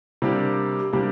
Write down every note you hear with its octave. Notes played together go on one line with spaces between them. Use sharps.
C3 G3 A#3 D4 G4
C3 G3 A#3 D4 G4